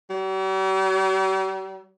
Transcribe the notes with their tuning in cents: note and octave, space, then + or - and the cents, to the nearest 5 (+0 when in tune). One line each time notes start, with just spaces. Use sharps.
G3 -45